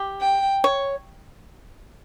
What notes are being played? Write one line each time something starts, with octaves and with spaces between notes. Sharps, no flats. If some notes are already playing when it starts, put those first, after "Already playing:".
Already playing: G4
G5
C#5